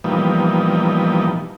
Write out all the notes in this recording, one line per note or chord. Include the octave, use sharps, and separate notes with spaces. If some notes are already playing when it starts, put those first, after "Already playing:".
A#2 E3 F3 G3 B3 D#4